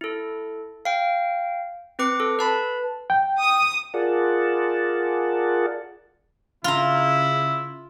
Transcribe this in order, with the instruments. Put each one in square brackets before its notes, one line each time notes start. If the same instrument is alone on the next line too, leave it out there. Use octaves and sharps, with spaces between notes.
[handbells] E4 A4
F5 G5
C4 B4 D6 C#7
A4
B4 A5 B5
[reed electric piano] G5
[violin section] D#6
[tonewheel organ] F4 G#4 A#4 D5 F#5 A5
[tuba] C#3 [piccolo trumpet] E4 [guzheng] F4 A#5